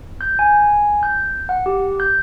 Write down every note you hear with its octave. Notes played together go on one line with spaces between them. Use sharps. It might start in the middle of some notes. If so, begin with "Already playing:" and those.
G6
G#5
G6
F#5
G4
G6